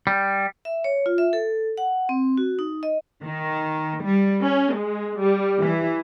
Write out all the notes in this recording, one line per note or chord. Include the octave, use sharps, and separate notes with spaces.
G3
E5
C#5
F4
E5
A4
F#5
C4
F#4
D#4
D#5
D#3
G3
C#4
G#3
G3
E3